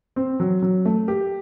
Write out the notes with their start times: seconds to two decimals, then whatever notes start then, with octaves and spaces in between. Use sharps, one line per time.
0.16 C4
0.40 F#3
0.62 F#3
0.85 A3
1.08 G4